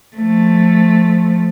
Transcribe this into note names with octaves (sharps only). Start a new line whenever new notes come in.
F3 A3